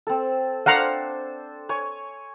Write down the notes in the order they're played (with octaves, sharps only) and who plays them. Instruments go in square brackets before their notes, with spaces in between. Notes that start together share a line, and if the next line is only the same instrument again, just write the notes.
[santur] C4 A4
[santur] D4 A4 C5 [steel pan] F5 F#5 A#5
[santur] C#5 G#5